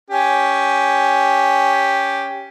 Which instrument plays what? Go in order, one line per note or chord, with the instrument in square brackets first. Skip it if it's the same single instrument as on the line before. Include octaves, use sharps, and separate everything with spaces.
[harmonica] C#4 G4